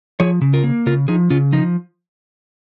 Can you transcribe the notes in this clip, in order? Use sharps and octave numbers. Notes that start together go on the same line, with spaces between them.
F3 G#4 C#5
C#3
F4 A#4
A#3
C#3 F4 A#4
F3 D#4 G#4
C#3 C#4 F4
F3 D#4